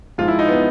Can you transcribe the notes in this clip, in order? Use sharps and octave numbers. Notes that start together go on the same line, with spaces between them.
G#2 F3 G#3 F4
E4
D#4
B3